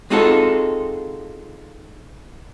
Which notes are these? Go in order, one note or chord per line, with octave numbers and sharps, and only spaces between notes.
G#3 C4 D#4 F4 F#4 A4